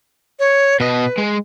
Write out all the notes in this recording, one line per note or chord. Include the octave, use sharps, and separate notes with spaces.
C#5
B2 B4 D#5
G#3